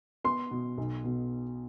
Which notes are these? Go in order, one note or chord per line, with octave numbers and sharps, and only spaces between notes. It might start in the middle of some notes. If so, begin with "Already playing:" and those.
B3 C6
B2
B1
B2